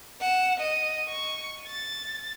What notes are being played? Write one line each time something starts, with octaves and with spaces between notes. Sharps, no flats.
F#5 E7
D#5 D#7
C#6
A6